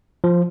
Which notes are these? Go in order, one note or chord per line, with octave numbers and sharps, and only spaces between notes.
F3